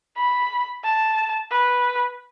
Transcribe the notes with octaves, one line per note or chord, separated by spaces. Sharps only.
B5
A5
B4